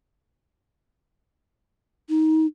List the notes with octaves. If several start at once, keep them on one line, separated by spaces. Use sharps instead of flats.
D#4